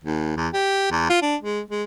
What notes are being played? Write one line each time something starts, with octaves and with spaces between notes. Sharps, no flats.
D#2
E2
G4
E2
F4
D4
G#3
G#3